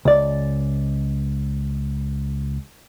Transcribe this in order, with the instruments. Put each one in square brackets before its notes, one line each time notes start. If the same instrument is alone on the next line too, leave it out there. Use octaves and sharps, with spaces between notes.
[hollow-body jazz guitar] C#2 D5